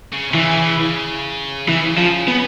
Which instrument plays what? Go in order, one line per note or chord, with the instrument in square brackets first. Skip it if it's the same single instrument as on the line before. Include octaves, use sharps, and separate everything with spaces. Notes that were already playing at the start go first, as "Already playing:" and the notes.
[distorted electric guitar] C#3
C3
[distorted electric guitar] C#3 [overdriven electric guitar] E3
[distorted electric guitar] C#3
C#3
[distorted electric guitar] C#3 [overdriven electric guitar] E3
[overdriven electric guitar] F3
B3